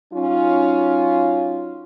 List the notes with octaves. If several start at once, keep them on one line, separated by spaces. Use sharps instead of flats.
F#3 C#4 D#4 F4